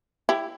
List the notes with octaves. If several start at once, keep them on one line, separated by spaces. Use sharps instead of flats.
E4 G4